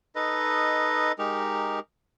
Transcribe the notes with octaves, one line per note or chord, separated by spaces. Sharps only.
D#4 A4 B4 D#5
G#3 D#4 G4 A#4